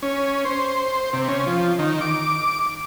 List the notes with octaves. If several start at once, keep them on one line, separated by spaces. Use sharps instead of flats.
C#4
C5
C3
C#4
F3
D#3
D6